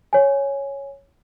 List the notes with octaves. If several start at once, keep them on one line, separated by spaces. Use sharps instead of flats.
C#5 G#5